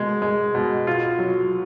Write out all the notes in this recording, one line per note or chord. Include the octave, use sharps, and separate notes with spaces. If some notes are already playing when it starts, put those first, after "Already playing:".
Already playing: B2 G#3
G#3
B2
F4
F#3